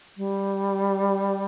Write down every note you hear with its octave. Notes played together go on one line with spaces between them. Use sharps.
G3